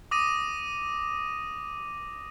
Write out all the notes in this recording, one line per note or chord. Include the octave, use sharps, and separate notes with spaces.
D6 D#6 A#6 D#7